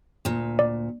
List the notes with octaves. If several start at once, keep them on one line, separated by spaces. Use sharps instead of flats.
D2 A#2
D5